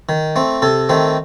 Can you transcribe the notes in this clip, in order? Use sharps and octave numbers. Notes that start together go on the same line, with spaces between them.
D#3
A3 C4
C3 A4
D#3 A3 C4